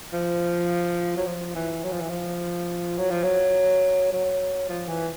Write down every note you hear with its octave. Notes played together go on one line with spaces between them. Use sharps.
F3
F#3
F3
E3
F#3
F3
E3
F3
F#3
F3
F#3
F#3
F3
E3